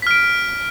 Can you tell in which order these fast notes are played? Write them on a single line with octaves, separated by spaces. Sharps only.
B6 F6 D7